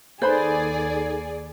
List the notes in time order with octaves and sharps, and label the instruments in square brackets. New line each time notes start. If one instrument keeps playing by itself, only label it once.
[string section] D#2 G#4 D5 [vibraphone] D#4 A4 [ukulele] B4 C5 B5